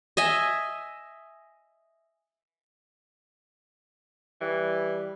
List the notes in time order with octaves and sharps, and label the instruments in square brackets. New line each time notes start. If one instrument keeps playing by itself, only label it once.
[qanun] D#5 E5 G#5
[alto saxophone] E3 [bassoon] G3